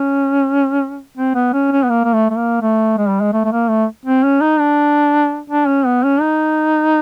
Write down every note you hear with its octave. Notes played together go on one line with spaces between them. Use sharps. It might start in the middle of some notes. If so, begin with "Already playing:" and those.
Already playing: C#4
C4
B3
C#4
C#4
B3
A#3
A#3
A3
A3
A#3
A3
G#3
G3
G#3
A3
A3
A#3
A3
C4
C#4
D#4
D4
D4
C#4
B3
C#4
D#4